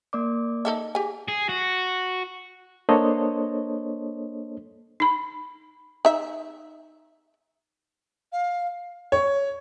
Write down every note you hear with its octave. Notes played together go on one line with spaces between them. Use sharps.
A#3 D5 D6
D#4 A4 E5
G4 G#4 G#5
G#4
F#4
A#3 D4 A4 C5 C#5 D#5
D#4 B5
D#4 E5
F5
C#5